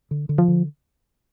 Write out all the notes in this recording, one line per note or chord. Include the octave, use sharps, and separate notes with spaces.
D3
D3
F3
D3